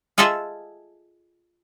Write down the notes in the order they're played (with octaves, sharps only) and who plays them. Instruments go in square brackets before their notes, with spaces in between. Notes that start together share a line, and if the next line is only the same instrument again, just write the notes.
[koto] F4 G#4 A4 D#5 E5 A5